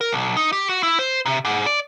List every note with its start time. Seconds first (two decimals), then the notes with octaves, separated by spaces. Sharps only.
0.01 A#4
0.13 B1
0.37 D#4
0.53 G4
0.69 F#4
0.83 E4
0.99 C5
1.26 C3
1.45 G#2
1.66 D5